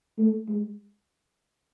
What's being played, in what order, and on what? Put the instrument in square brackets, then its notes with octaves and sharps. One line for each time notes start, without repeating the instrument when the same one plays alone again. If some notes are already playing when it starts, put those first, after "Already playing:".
[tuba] A3
G#3